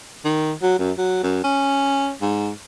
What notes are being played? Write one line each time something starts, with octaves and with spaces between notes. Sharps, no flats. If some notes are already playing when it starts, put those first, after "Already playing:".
D#3
F#3
F#2
F#3
F#2
C#4
G#2